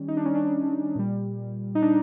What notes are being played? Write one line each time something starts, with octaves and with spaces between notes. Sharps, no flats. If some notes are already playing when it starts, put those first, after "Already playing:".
Already playing: D#3 G3 C#4
D#4
D4
C#4
D4
A#2 G3
D#4
D4